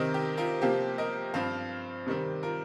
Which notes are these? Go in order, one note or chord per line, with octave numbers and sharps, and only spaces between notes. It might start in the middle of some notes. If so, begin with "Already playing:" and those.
Already playing: C3 D#3 C4 A#4 D#5
G4
F4 A#4
C3 F3 A#3 G4 C5
A#4 D#5
G2 F3 C4 C5 F5
C3 D#3 G3 C4
F4 A#4